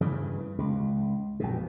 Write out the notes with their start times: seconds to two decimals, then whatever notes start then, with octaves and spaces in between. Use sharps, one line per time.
0.01 G2 C#3 E3
0.58 C#2
1.40 A#1 F#2 B2